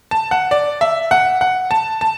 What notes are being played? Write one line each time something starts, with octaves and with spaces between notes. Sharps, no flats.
A5
F#5
D5
E5
F#5
F#5
A5
A5